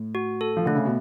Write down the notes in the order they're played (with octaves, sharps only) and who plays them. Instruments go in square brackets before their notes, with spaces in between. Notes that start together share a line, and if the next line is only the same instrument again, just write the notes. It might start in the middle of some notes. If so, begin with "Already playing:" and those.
Already playing: [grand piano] A2
[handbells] F#4
A4
[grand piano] F3
[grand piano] D3 [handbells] A3
[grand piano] C#3
B2